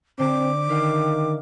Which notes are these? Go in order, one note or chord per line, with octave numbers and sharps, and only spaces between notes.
D3 C4 C5 D6
D#3 E5 F5 G5